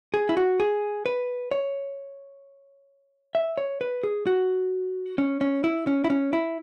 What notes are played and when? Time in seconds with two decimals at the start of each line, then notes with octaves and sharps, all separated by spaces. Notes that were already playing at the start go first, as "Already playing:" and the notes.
0.14 G#4
0.29 E4
0.37 F#4
0.60 G#4
1.06 B4
1.51 C#5
3.35 E5
3.57 C#5
3.81 B4
4.03 G#4
4.27 F#4
5.18 C#4
5.41 C#4
5.64 E4
5.87 C#4
6.04 E4
6.10 C#4
6.33 E4